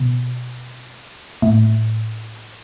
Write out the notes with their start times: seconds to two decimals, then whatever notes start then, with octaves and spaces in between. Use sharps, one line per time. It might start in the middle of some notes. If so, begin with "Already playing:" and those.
Already playing: B2
1.42 A2